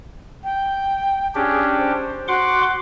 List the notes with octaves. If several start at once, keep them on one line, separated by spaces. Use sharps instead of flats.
G5
C#4 D4 G4 G#4
C5
F#4 F#5 C6 D6